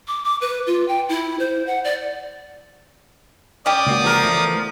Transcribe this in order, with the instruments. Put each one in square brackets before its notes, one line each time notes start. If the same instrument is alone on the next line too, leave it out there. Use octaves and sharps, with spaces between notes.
[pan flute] D6
D6
B4
F4
G5
E4
C5
F#5
D5
[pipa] C#4 G4 [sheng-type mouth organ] D5 D6 D#6
[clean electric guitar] C#2 A#3 F#4
[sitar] F3 A#4
[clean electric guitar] E3 A3 B3